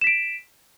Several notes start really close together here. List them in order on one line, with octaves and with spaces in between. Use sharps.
E7 B6 D7